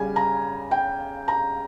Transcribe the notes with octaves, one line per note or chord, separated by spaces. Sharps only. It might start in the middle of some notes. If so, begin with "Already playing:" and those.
Already playing: C#3 G3 G#5
A#5
G5
A#5